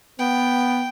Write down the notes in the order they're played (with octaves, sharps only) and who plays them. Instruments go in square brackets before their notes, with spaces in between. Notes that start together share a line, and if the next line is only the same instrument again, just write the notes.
[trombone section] B3 [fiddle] G5